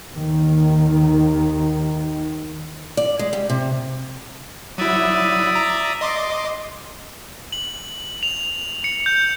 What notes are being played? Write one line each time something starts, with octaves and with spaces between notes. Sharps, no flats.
D#2 D#3
D5
G#3
G3
C3
F#3 E4 D5 E5 D#6
A#5
D#5 C6 D6
F#7
F7
C#7
G6